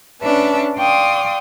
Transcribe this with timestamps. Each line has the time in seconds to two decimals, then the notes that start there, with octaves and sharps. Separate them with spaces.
0.22 C#4 D4 B4 E5 A5
0.77 D5 F5 G5 C6 C#6 D#6